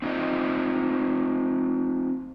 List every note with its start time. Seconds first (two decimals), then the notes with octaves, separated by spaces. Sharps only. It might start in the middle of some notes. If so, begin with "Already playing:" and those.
0.02 C4 D#4 F4 D#5